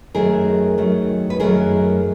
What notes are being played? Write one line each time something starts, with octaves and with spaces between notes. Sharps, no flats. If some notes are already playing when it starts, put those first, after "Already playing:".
F#2 D#3 F#3 A3 G#4 A#4
F#2 D#3 F#3 A3
B4
F#2 D#3 F#3 A3 G#4 A#4